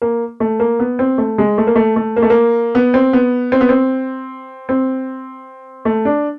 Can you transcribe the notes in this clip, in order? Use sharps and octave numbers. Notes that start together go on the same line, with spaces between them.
A#3
A3
A#3
B3
C4
A3
G#3
A3
A#3
A3
A3
A#3
A3
A#3
B3
C4
B3
C4
B3
C4
C4
A3
D4